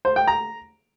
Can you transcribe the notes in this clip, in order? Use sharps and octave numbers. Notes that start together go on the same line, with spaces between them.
C5
G5
A#5